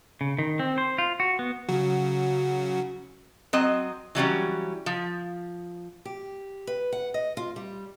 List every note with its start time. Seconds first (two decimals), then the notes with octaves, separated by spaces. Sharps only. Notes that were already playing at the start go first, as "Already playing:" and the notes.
0.21 C#3
0.39 D#3
0.59 C4
0.78 C5
0.98 F4
1.20 F#4
1.39 B3
1.69 C#3 F#3 F#4
3.53 F#3 C4 D#5
4.15 E3 F#3 G3 C#4
4.86 F3
6.05 G4
6.67 B4
6.92 F#5
7.14 D#5
7.37 F4
7.56 G3